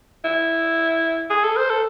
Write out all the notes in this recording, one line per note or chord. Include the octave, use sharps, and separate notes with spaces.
E4
G#4
A4
C5
A4